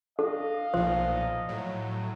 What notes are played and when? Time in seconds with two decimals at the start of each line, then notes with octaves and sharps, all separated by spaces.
0.19 D4 A4 D#5 F5
0.74 B1 A#2 F3 C5
1.49 A2 F#3